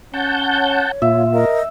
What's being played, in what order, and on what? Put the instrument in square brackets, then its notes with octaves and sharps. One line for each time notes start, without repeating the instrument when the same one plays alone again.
[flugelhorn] C#4 [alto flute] C#5 [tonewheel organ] F#5 A5 G6
[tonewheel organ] A#2 F4 [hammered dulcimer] E5
[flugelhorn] A#4 [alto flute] D#5